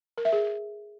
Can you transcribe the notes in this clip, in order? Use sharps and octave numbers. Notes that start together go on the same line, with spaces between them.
A#4
E5
G#4